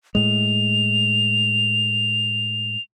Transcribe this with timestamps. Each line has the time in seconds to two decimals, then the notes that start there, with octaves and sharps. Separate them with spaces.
0.15 A2 G#3 F7